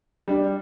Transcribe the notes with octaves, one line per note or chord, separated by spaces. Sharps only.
G3 D4